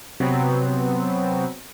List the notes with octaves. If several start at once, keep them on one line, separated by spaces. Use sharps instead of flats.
C3 F#3 B3 C4